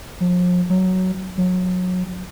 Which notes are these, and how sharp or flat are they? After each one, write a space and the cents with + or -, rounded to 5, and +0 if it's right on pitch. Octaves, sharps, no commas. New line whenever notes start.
F3 +40
F#3 +5
F#3 -25